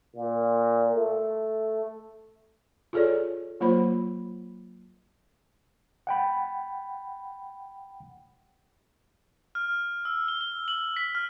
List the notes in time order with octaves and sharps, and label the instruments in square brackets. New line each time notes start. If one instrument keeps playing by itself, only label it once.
[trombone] A#2
A3
[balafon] F4 G#4 A4 C#5 D5
F#3 A#3 F4 C5 B5
[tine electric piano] F#5 G5 B5
[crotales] F6
E6
G7
G7
F#7
B6
F6